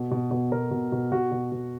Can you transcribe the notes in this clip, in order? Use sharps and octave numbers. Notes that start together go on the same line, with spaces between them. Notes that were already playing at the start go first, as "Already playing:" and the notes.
Already playing: B2
B2
B2
B2 A#4
B2
B2
B2 F#4
B2
B2